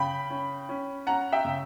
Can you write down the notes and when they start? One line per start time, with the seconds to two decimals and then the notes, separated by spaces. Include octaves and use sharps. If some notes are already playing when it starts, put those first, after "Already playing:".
Already playing: C#3 C#4 G5 B5
0.30 C#4
0.69 C#4
1.07 C#4 F#5 A#5
1.32 E5 G5
1.45 C#3